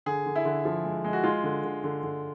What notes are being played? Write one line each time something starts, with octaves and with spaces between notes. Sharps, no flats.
D3 G#4
D3
E4
D3
F3
G#3
G#3
F#4
G#3 F4
D3
D3
D3
D3